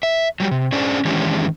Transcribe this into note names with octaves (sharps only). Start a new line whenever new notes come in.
E5
F#3 G3 G4
C3
C#4 D4 G#4 C5 D5
D#3 E3 G#3 C#4 D4 G4